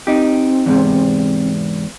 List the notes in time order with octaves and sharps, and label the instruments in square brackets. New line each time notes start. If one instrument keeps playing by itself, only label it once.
[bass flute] C4 [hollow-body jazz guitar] D#4 G4
[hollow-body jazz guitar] E2 G#2 C3